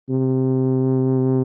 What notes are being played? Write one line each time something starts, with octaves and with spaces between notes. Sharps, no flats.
C3